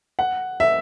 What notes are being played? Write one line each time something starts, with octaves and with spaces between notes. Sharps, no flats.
F#5
E5